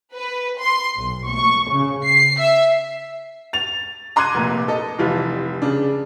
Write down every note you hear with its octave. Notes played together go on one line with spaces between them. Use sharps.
B4
C6
B1
C#6
C#3
C7
E5
A6 F7
A#5 C6 D6 F#6 G#6 D#7
F1 A#2
A4 D#5
F1 E3 G3 F4
C#3 D4